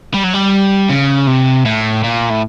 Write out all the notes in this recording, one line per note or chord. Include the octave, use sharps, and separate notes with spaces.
G3
F#3
G3
C#3
C3
A2
A#2
A2